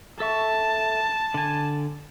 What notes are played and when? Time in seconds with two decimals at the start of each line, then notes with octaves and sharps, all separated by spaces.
0.20 A4 E5 A5 C#6
1.34 D3 G#5